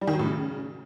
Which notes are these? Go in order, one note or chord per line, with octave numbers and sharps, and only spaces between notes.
G3
D#3
F#3
A2
C#3